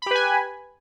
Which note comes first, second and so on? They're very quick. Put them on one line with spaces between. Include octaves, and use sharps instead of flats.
B5 G4 B4 G#5